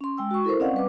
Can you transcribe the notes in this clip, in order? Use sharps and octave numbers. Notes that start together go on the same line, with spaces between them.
C#4 C6
G#3 G5 E6
F#4 C#6
E4 A4 A#4 C5
C4 C#4 D5 D#5 F5 F#5
G3 B4 D6